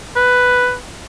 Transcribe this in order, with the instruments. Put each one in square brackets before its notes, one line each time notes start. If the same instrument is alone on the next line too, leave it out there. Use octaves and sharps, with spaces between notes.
[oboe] B4